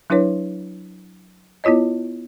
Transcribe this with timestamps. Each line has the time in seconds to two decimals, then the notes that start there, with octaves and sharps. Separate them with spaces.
0.10 F#3 D4 E4 B4 C#5
1.64 B3 E4 F4 C#5 D#5